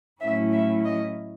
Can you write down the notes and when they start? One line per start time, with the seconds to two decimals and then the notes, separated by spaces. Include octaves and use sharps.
0.21 A2 F#3 A3 C#4 E4 E5
0.52 E5
0.85 D#5